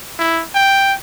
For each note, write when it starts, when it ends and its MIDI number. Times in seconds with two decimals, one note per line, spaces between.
0.19 0.42 64
0.55 0.94 79